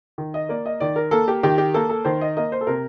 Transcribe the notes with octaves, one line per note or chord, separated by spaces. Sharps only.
D#3
D#5
A#3 D5
D#5
D#3 D5
A#4
A#3 A4
G4
D#3 G4
G4
A#3 A4
A4
D#3 C5
D#5
A#3 D#5
C5
A4
C3 A#4